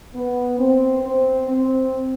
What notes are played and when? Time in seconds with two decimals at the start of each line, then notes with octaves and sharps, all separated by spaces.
0.14 B3
0.58 C4
1.03 C4
1.47 C4